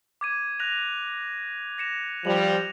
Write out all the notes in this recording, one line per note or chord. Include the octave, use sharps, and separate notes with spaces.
D6 G#6 D#7
F#6 A#6 F7
A#6 C#7 E7
F3 G3 F7 F#7